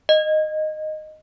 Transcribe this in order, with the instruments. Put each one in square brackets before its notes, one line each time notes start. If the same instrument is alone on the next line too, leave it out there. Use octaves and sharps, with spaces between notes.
[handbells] D#5